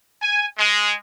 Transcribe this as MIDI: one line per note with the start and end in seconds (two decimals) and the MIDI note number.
0.22 0.46 80
0.58 0.95 56